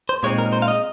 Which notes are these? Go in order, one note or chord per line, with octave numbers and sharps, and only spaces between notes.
C5
A#2 G#3 C4 D#4 C#5
A#4
C5
F5
D#5